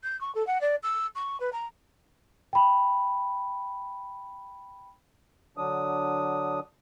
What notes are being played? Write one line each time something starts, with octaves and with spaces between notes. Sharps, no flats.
G6
C#6
A4
F#5
D5
E6
C#6
B4
A#5
G5 B5
D3 F#3 D4 D#6